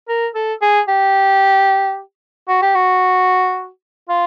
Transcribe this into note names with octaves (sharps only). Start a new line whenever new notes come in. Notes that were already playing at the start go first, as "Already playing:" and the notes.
A#4
A4
G#4
G4
F#4
G4
F#4
F4